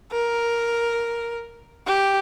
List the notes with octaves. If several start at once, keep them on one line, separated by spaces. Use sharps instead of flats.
A#4
G4